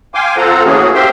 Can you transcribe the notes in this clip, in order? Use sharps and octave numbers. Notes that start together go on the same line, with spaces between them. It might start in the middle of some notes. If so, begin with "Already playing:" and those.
F5 G5 G#5 C6 D6
C4 F4 A4 C5 F#5 A#5
E3 A3 A#3 C#4 F#4 G#4
G4 C5 E5 F5 G5 C6